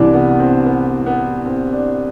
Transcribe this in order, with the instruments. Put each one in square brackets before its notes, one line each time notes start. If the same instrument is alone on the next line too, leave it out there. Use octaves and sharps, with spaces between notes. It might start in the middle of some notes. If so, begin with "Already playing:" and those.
Already playing: [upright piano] C2 C3 E3 D4
B3
B3
C4
B3
B3
C4
D4